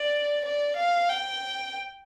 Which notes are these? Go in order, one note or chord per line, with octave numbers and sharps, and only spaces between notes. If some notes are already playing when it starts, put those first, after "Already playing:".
Already playing: D5
D5
F5
G5